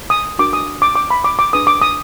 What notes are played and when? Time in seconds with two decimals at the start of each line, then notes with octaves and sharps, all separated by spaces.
0.10 D#6
0.39 D4 F#4 A#4 D6
0.53 D#6
0.82 D6
0.96 D6
1.11 B5
1.24 D6
1.39 D6
1.53 D4 G#4 B4 D#6
1.67 D6
1.82 D#6